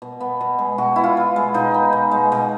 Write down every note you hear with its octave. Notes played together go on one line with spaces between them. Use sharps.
B2
B3
B2
G#3
B2 F#4
B3 E4
F4
B2
G#3
B2 D#4
B3
B2
G#3
B2